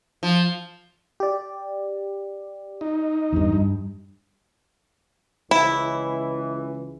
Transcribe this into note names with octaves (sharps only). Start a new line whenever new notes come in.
F3
G4 D5
D#4
E2 G2
G2
C#2 E3 E4